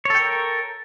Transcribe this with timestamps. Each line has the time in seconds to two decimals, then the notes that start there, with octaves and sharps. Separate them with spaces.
0.05 C#5
0.10 A4
0.15 G5
0.19 A#4